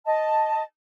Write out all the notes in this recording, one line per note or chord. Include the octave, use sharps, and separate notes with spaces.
D#5 A5